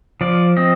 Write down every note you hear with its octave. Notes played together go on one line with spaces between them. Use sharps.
F3 D5
C4 D#5